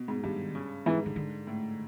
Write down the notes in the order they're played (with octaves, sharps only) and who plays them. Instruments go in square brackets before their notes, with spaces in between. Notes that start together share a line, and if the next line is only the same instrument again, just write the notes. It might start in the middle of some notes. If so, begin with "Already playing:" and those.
Already playing: [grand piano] B2
G#2
[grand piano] G2 [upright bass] D#3
[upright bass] C#3
[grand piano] G#2 [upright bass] E3
[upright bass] D3
D3
[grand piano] A2